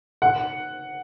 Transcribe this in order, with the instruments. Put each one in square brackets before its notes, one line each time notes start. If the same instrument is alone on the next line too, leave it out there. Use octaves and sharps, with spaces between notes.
[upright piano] F#5